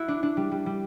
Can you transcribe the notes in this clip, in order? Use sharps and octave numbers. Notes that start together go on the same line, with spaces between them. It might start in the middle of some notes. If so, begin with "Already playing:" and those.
Already playing: E4 F#4
D4
D4
G3
G3
G3